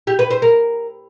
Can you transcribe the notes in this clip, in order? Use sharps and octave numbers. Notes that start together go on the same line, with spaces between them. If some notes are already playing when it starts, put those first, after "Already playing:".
G4
B4
C5
A#4